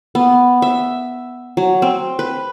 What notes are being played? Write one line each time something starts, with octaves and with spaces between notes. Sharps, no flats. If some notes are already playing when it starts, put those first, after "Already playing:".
B3
E5
F#3
C4
B4